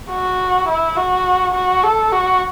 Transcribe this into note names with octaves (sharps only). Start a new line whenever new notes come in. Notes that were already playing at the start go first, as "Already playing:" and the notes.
F#4
E4
F#4
F#4
A4
F#4